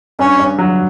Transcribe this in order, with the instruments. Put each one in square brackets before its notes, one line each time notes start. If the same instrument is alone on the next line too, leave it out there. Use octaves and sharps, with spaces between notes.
[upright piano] G2 [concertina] C#4
[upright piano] G2
F#3